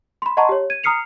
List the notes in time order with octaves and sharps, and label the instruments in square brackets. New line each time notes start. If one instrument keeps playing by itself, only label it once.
[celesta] B5 C6
D#5 F#5 A5 A#5 C6 C#6
G4 C#5
G#6 D#7
A#5 D#6 F6 C7 C#7 F7